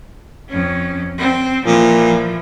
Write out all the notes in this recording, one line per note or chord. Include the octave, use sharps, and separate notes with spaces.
F2 C#4
C4
A#2 E3 F3